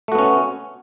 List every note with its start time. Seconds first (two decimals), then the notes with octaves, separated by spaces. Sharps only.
0.08 A3
0.12 F#4
0.15 B3
0.19 C#4